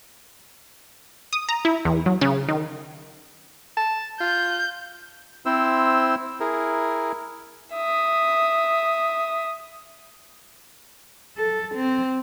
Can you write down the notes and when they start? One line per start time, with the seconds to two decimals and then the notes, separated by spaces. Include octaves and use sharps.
1.33 D#6
1.49 A#5
1.65 E4
1.85 E2
2.06 F#3
2.21 C#3
2.48 D#3
3.77 A5
4.20 F4 G6
5.46 C4 E4 C5 E6
6.40 E4 G#4 A#4
7.74 E5 D#6
11.38 A4
11.75 C4